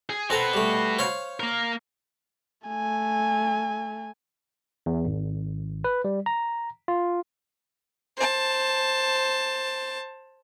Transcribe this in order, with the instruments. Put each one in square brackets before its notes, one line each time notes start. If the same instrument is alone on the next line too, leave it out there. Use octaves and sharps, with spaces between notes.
[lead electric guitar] G#4
[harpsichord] C4 A4 A#5 [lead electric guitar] F#4 B4
[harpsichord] G3 A3
C5 C#5 F5
[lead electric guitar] A#3 A#4
[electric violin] A3 G#5
[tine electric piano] E2
G#1
B4
G3
A#5
F4
[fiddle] C5 A5